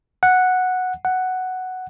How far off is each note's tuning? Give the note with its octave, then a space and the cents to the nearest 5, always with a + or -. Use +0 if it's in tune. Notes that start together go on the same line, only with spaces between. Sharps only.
F#5 -5
F#5 +5